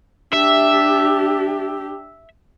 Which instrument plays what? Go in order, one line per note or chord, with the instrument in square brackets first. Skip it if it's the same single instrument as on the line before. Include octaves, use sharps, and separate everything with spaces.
[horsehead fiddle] D4 G4 [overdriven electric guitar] E5